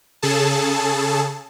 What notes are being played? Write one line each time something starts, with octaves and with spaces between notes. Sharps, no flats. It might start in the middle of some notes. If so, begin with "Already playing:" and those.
C#3 G#4 A4 A5